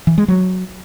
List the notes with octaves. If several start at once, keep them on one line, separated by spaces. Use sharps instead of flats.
E3
G#3
F#3